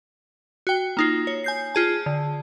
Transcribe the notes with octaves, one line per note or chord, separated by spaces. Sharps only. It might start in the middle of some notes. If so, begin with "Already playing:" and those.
F#4 G5
A#3 D#4 F4
C#5
G#5 G6 C7
F4 G#4 A5
D3